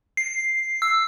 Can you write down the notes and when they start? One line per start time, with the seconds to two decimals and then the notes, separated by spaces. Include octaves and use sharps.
0.17 C7
0.82 E6